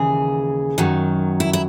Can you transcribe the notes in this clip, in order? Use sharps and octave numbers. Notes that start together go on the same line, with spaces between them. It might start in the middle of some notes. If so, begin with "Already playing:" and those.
Already playing: D#2 C#3 E3 G#4
F#2 D#3 F#3
E4
E4